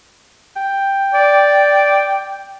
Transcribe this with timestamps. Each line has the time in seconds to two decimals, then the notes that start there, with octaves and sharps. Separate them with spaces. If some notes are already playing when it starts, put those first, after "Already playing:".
0.56 G5
1.14 D5